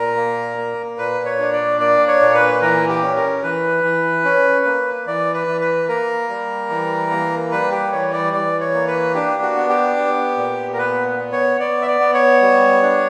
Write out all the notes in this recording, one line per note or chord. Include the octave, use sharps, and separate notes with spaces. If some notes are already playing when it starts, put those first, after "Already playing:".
Already playing: A#2 A#4
A#3
A#3
A#2 B4
C#5
D4
D5
A#3 D5
C#5
A#2
B4
E3 A#4
G4
C#4
A#4
E3 B4
E3
C#4
A#3
E3 D5
B4
E3
B4
A#3 A#4
G3
E3
A#3
G3 B4
G4
E3 C#5
D5
E3 D5
C#5
A#3
B4
D4 G4
F#4
B3
G4
B3
A#2
A#4
B3 B4
B3
C#5
B3 D5
E5
D5
B3
C#5
G3
D4